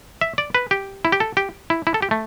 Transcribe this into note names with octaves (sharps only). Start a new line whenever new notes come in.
E5
D5
B4
G4
E4
G4
A4
G4
E4
E4
A4
G4
A3